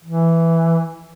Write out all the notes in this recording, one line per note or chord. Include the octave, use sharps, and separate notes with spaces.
E3